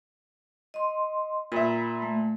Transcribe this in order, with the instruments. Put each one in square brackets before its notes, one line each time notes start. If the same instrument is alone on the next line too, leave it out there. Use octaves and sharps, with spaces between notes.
[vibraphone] D#5 C6
[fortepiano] A#2 E5 [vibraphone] A#5 B5
[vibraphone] A3